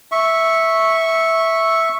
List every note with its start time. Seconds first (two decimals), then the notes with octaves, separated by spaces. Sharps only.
0.12 E5 C#6